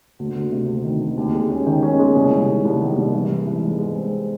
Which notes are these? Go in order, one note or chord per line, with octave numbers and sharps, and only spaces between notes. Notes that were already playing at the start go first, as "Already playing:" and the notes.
D2
D2
C3
D2
D#3
D2
D#2
G#3
C#4
D#3
C#4
G#3
C2
C2
D#3
C2
D#3
C2
E3
G#2
E3
G#2
G#3
C4